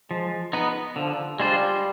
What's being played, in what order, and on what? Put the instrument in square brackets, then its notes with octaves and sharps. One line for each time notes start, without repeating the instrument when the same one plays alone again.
[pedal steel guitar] F3 [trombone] G#3
[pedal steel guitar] B3 D#4 B4
[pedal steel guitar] D3 [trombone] F3
[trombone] G3 [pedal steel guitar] G#3 D4 F4 C5